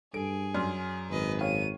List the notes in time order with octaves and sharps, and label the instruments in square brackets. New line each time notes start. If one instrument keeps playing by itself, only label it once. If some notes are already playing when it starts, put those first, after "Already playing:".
[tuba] G2 [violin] G#4 [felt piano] A4 [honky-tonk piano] D7
[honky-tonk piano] F#2 [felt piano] D5 C6 F6
[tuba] G#1 [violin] B4 D#5
[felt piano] C#5 F5 G5 [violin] D#7